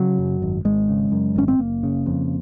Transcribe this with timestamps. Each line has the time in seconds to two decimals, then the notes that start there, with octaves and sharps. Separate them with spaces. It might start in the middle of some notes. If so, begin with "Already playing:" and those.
Already playing: C#3 F#3
0.18 F#2
0.42 G#1
0.65 G#1 G#3
0.89 C#3
1.12 F#2
1.36 G#1 C#4
1.48 C4
1.59 F#1 A#3
1.83 C#3
2.06 F2